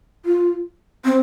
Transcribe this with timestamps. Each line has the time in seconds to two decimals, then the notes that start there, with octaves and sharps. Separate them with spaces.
0.25 F4
1.05 C4